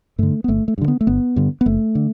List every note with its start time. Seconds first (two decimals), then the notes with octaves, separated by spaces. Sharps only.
0.18 G2 D3 A3
0.44 B3
0.48 G1 A3
0.68 A3
0.78 G2 D3
0.88 B3
1.01 A3
1.07 G1 B3
1.36 G2 D3
1.61 B3
1.66 F#1 A3
1.95 D3